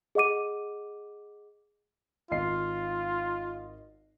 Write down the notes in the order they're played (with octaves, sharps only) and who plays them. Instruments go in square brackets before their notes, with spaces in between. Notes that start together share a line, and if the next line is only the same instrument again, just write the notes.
[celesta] G#4 D#5 F#5 D6 D#7
[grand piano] G#1 D#5 C7 [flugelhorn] F4